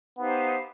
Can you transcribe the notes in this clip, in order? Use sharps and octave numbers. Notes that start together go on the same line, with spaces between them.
B3 D#4 G4 C5 F5